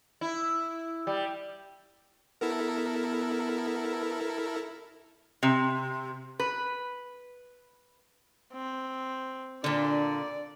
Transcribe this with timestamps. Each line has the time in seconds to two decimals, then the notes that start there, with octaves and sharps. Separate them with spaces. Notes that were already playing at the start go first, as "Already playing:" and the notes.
0.21 E4
1.07 G3
2.41 B3 E4 A4 A#4
5.43 C3
6.40 B4
8.53 C4
9.64 A#2 D3 D4 D5